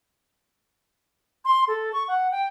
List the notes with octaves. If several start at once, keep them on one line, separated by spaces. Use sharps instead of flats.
C6
A4
C#6
F#5
G5